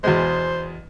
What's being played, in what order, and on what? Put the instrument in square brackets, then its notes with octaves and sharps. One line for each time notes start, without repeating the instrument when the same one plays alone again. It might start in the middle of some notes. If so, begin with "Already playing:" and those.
[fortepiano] E2 B2 G#3 [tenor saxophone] C5